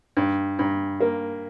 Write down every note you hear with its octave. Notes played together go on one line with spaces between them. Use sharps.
G2
G2
A#3